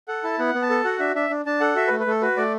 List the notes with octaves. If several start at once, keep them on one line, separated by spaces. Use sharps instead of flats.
A4 F#5
E4 A5
B3 F#5
B3
A5
A4
F#4 F#5
D4 E5
D4 E5
D4
D4 A5
A4 F#5
F#4 E5
B4
A3
B4
A3 A4
F#4 B4
A3 D5